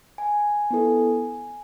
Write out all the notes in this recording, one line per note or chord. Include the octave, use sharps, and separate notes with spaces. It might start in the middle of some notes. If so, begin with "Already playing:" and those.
G#5
B3 E4 A4